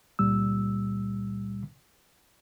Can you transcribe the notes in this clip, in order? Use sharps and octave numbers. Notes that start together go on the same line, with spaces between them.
C#2 A#2 G3 E6